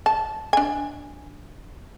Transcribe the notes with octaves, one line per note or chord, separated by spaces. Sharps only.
A5
D4 G#5